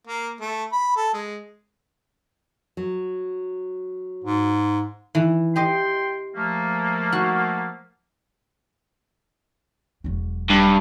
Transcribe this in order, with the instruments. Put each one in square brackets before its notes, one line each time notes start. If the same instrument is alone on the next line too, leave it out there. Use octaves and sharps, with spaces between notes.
[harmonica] A#3
A3
B5
A4
G#3
[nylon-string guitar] F#3
[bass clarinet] G#2
[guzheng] E3
[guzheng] G4 D#5 [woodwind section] G5 C6
[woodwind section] F3 A3 A#3
[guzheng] F#4
[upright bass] E1 F#3
[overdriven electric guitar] G2